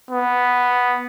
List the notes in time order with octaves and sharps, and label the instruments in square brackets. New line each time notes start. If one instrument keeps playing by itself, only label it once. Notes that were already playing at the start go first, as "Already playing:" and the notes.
[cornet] B3